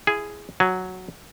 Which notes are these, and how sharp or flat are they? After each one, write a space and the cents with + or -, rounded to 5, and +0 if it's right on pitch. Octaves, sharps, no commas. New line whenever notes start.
E4 +35 G#4 +0
F#3 +0 G#5 +0